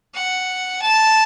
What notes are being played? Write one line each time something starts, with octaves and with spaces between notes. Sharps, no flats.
F#5
A5